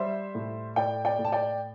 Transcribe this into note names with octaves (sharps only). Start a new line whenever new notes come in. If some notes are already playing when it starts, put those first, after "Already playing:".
Already playing: G3 C5 E5
A2
A2 D5 G5
D5 G5
A2
A5
D5 G5